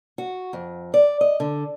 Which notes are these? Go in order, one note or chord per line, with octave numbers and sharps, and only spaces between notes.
F#4
F2
D5
D#5
D3